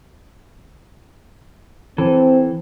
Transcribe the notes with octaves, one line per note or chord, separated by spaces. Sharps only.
E3 C4 A4